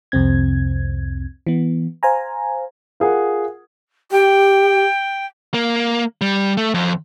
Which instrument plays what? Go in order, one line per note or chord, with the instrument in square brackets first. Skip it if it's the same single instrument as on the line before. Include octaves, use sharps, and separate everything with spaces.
[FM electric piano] C2 F2 C3 C4 G#6
E3 B3
C5 F5 G#5 A#5
[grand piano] F4 G#4 A#4 F#5
[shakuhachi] G4 [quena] G5
[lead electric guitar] A#3
G3
A3
F2